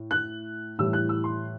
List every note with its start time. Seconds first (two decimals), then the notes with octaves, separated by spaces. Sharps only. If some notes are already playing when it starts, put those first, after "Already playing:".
Already playing: A2
0.11 F#6
0.79 A2 E3 G3 E6
0.93 F#6
1.09 E6
1.24 C6